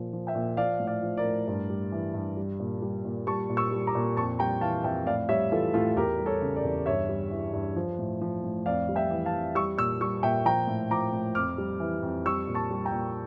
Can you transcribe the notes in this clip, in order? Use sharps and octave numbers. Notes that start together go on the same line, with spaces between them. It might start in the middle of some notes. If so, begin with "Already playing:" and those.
Already playing: A#2 F3
F3
E5 G5
A#2
F3 D5 F5
A2
D5 F5
F3
A#4 D5
A2
G2
G3
E3
G2
G3
A#2
G3
A#2
G3 A5 C#6
A#2
C#6 E6
G3
A#5 D6
A#2
F2 A5 C#6
G3 G5 A#5
E3 F5 A5
F2 E5 G5
A2 D5 F5
G3 C#5 E5
E3 F4 A4
A2 F4 A4
E2 G4 A#4
G3
A4 C#5
C#3
A#4 D5
E2
G2 C#5 E5
G3
E3
G2
F3
A2
F3
A2
F2 D5 F5
G3
E5 G5
E3
F5 A5
F2
G3 C#6 E6
A#2 C#6 E6
G3 C#6 E6
A#2 E5 G5
F3 G5 A#5
A2
F3 A#5 D6
A2
F2 D6 F6
G3
E3
F2
G3 C#6 E6
A#2
A5 C#6
G3
G5 A#5
A#2